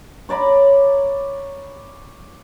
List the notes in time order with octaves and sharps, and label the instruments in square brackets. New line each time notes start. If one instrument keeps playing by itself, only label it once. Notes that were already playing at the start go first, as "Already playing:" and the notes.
[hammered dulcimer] C#5 D5 A#5 B5